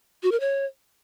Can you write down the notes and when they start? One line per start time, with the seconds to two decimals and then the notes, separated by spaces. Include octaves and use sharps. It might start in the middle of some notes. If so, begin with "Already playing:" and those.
0.23 F#4
0.32 A#4
0.40 C#5